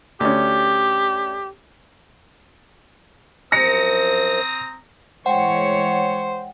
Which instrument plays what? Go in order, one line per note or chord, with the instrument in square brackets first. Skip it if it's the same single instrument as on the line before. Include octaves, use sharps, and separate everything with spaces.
[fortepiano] D2 C#4 [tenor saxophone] G4
[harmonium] F#2 F3 [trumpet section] C4 A#5 D#6 [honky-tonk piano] A#6 C#7
[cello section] E3 G#3 C#5 [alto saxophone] C5 [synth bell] F#5 G5